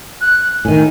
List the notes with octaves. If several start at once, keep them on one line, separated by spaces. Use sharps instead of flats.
F#6
A2 D#3 G#5